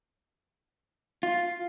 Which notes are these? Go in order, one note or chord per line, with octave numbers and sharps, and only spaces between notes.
F4